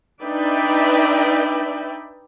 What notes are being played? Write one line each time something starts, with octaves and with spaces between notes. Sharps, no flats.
D4 D#4 B4 D5 E5 G5